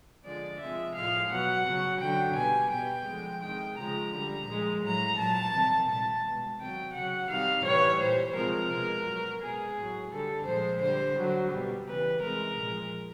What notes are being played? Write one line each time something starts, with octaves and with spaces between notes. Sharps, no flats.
D3 F3 G#3 D5
C3 F3 G#3 E5
A2 F3 G#3 F5
B2 F#3 F#5
C#3 F#3
D3 F#3 G5
B2 G3 G#5
B2 G3 G5
D3 F3 G#3
C3 D#3 G#3 G5
C#3 F3 G#3 A#5
D3 G3
A#2 F3 G#3
A2 F#3 A#5
A#2 F#3 A5
C3 D#3 G3
A#2 G3 A5
B2 G#3
C3 D#3 F#3 G5
C#3 F#3 F#5
C3 D#3 G3 F5
A2 E3 G3 C#5
A#2 G3 C5
C3 F3 G#3 A#4
B2 G#3
B2 F#3
B2 G#3 G#4
A2 F#3
D3 G3 A4
A#2 F3 G#3 C5
D3 G3 C5
D3 F#3
B2 G3
C#3 E3 G3 B4
C3 E3 G#3 A#4
A#2 F3 G#3